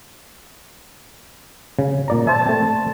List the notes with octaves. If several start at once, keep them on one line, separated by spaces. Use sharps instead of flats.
C#3
A#2 D5 A#5
C5 E5 A5
A3 C4